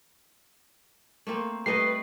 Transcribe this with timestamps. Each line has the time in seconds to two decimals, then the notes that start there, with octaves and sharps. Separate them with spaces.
1.27 A3 A#3 C4
1.66 G3 A3 B4 D#5 C7